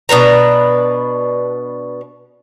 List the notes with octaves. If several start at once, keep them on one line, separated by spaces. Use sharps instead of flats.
B2 D4 B4 A#5